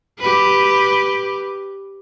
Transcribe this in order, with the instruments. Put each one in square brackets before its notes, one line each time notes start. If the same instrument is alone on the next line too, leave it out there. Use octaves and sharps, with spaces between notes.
[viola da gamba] G4 B4